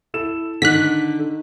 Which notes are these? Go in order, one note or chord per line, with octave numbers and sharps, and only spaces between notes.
E4 A4 E7
D3 D#3 F#6 B6